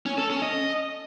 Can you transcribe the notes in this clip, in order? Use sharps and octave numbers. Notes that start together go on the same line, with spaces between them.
C#4
A4
C#4
D#5